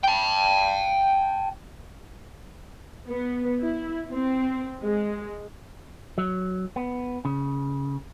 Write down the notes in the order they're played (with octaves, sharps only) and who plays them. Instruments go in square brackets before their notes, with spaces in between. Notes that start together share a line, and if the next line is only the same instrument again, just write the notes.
[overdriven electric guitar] G5 A5
[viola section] B3
E4
C4
G#3
[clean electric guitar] F#3
B3
C#3